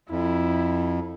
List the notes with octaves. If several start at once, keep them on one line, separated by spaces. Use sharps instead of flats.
F2 E4